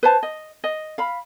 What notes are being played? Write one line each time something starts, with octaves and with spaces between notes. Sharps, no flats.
B4 C5 A5
D#5
D#5
F5 B5